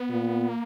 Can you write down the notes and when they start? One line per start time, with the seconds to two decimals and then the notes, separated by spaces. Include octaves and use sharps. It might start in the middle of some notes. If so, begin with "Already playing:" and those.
Already playing: B3
0.10 A#2
0.49 A#3